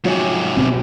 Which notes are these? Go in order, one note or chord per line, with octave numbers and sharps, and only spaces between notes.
G#2 C3 F3 F#3 F#4 C#5 G#5
B2 B3 C4